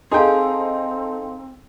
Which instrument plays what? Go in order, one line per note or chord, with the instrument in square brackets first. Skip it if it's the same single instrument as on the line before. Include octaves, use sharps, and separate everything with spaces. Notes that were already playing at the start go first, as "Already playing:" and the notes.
[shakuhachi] C4 [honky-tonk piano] D#4 A4 [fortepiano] G#4 G5 [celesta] F5 A#5 C6